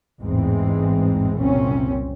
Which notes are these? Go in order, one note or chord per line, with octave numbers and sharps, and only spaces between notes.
A1 E2 G#2 E3 G#3 C4
F#1 C2 A#2 C4 C#4